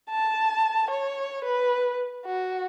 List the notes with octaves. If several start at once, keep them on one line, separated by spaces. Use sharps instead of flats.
A5
C#5
B4
F#4